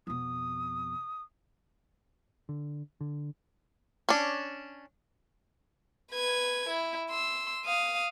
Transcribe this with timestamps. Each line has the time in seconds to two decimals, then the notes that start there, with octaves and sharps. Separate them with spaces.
0.07 F2 B2 D#6
2.49 D3
3.01 D3
4.09 C#4 D4
6.12 B4 G#6
6.69 E4
7.10 C6 E6
7.65 F5 D#6